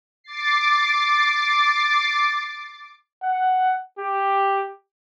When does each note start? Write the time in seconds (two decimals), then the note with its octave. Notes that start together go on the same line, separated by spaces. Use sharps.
0.24 D6 A6 C7
3.23 F#5
3.99 G4